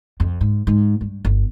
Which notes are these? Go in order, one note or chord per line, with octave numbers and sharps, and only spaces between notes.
F2
G#2
G#2
G2
G1